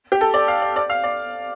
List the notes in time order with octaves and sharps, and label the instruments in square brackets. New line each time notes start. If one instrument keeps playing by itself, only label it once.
[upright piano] G4
A4
D5
F5
D5
D5
F5
D5